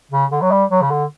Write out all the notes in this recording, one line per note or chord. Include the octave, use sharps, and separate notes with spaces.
C#3
D3
F#3
G3
F#3
C#3
D3